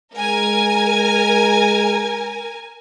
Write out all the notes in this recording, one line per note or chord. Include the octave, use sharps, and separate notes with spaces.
G#3 A#4 G#5